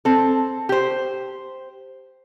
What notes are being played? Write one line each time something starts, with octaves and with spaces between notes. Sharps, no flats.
C4 A4
G4 C5